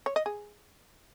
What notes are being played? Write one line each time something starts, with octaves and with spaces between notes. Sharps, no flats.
C#5
D#5
G#4